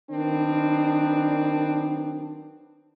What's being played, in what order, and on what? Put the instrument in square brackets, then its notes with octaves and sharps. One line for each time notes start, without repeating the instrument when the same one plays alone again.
[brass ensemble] D#3 F#3 B3 C4 D4